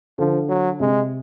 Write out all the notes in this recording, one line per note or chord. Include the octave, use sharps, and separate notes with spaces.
D3 F3
F#3
C3 G#3